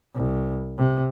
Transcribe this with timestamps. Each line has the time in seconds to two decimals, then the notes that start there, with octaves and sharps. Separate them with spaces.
0.15 C2
0.78 C3